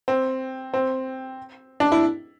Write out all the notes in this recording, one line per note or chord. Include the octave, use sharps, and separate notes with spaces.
C4
C4
D4
E4